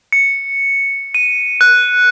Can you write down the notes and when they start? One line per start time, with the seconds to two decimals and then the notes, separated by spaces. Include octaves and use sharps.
0.12 C#7
1.15 D#7
1.61 F#6